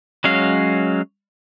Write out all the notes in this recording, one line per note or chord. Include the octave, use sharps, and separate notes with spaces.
F#3 G#3 C#4 F5